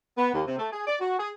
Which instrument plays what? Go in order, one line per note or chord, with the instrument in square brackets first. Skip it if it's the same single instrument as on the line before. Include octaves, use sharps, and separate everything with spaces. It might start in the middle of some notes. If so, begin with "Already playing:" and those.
[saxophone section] B3
D#2
C3
A3
G#4
D5
F#4
G#4